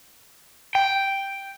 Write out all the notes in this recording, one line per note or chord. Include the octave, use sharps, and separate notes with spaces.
G5